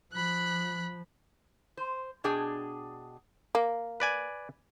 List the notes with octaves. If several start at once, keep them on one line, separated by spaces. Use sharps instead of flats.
F3 B5 F#6
C5
B2 D4 G#4 G5
A#3
B4 D5 G#5